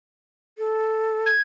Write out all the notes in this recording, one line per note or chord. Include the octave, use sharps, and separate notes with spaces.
A4
G#6